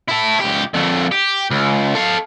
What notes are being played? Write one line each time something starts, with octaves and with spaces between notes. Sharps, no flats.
E4 A4
C#2 G4
F2 D3
G4
C#2
A4 F5